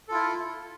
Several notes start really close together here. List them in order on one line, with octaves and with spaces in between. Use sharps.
A4 F4 E4